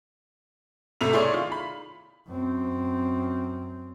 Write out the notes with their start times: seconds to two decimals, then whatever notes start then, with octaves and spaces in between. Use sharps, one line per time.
1.01 B1 C3 A3 E5 F7
1.13 E4 G#4 C#5 D5 C6 C#6
1.32 D#3 F4
1.52 B5
2.28 F#2 C4